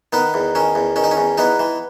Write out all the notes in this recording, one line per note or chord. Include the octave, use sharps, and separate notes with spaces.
D#3 B3 D#4
E2
D#3 C#4
E2
D#3 C#4
D#4
C#4
E2
E3 B3 D#4
E3